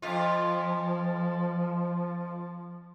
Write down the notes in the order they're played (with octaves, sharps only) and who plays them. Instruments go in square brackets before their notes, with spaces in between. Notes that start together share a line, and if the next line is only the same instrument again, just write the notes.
[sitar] F2 F4 [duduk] F3